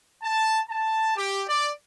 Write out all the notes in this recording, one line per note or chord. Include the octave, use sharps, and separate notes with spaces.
A5
A5
G4
D5